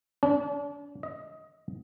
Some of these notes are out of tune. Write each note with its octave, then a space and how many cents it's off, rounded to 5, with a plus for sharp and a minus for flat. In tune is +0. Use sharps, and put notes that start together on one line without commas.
D4 -40
D#5 +20